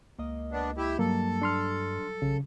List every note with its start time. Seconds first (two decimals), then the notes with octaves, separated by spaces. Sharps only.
0.19 C#2 A#3 D#5
0.52 B3 D4
0.78 E4 G4
0.99 G2 F#3 G3 A#3 A4
1.42 D4 C6 F6
2.22 A#1 C#3